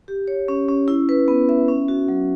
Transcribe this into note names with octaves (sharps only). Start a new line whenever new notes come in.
G4
C#5
C#4
C#4
E4
B4
B3
E5
C#4
F#4
F#3